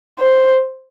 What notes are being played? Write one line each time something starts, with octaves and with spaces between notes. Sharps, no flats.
C5